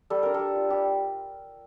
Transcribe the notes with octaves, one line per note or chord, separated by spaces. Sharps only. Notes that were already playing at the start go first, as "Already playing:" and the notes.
G3 A4
D4 A#4
G3 A4
F4
G3 G4